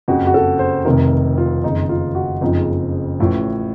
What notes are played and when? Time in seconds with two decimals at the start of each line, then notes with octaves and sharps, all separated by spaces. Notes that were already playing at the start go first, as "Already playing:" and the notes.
0.08 F#1 F2 C#3 F#4
0.27 F#4
0.34 A4
0.59 C5
0.85 F1 F2 C3 D#3 A#4
1.38 F4
1.63 F#1 F2 D#3 D#4
1.89 F4
2.15 F#4
2.41 F#1 F2 C#3 F3 D#4
3.19 A1 A2 F3